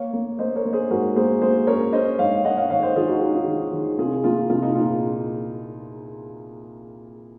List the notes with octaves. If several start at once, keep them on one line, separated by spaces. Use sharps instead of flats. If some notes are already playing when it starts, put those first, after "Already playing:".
Already playing: A#3 C#5 F5
A#3
A#3 C5 D#5
A#4 C#5
A#3
G#4 C5
G#2 F#4 A#4
A#3 G#4 C5
A#3 G#4 C5
C#4 A#4 C#5
C#4 C5 D#5
G#2 C#5 F5
G#2 D#5 F#5
C#5 F5
D#3 C#5 F5
C5 D#5
D#3 F4 G#4
D#4 F#4
C#4 D#4 F#4
F4 G#4
D#3
D#3
C2 F4 G#4
A#3 F4
C2 F4
D#4
A#2 F4